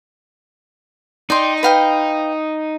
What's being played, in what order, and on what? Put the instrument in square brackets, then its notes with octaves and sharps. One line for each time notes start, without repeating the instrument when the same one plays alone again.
[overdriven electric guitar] D#4 [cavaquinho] D5 G5 C6
[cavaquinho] B4 F5 G5